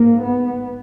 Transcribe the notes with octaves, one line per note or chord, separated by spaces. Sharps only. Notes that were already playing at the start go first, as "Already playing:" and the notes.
Already playing: G#2 A#3
B3